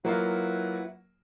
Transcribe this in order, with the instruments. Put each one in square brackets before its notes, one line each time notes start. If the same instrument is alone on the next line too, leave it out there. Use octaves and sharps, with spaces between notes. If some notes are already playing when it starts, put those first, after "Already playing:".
[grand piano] F#3 A#3 F4 [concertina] E4 B4 F#5